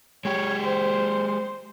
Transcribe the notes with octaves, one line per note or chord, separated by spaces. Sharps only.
G#3 G4 C#5
C5